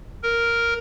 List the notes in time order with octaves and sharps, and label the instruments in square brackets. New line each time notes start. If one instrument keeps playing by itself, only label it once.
[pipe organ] A#4